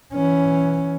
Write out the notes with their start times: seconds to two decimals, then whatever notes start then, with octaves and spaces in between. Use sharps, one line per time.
0.13 E3 C#4